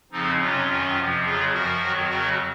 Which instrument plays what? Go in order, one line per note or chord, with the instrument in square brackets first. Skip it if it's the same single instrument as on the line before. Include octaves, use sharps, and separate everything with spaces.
[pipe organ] F2 C#3 F3 C4 D#4
F2 C3 F#3 C#4 F4
F#2 D#3 F#3
F2 C3 F3
F2 C#3 F#3 F4 G#4
F#2 F3 F#4 A#4
F2 D#3 F#3
F2 C#3 F#3 F#4 A#4